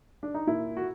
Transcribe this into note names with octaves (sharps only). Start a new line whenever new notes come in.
D4
D#4
A#2 E4
F#4